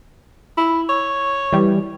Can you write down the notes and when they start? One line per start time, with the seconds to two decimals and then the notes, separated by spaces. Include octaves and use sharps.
0.57 E4
0.89 C#5
1.53 E3 G3